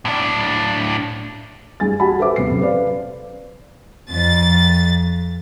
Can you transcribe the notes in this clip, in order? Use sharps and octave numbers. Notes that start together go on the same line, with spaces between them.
A2 D4
C2 G2 G#4 G#5 A6
F#4 G4 F#5 G#5 A5 B5
A4 B4 C5 E5 D6
D#1 C3 B3 C7
F#2 C3 C#4
B4 C5 D5 F5
F2 A6